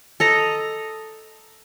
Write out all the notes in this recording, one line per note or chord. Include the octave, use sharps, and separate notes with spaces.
A4 D#5 A#5